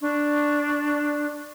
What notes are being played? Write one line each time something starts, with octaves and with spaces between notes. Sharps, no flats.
D4 C#6